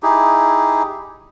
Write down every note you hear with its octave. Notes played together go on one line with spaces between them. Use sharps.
D#4 E4 G4 G#4